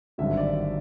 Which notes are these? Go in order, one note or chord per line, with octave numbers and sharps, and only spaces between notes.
G#1 G2 D3 F#3 E5
D5